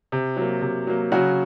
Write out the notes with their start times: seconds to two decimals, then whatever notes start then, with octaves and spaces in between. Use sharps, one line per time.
0.12 C3
0.37 F#3 A#3
0.62 C3
0.87 F#3 A#3
1.12 C#3 F#3 F#4